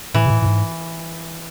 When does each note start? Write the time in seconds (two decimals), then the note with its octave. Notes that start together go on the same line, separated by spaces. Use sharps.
0.14 A2 E3
0.26 C3
0.30 A2
0.42 A2
0.46 G#2